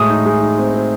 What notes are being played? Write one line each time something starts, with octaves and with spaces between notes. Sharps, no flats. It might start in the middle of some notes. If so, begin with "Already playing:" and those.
Already playing: A2 G#3 D#6
D#4
G#3
D#4
C4
C4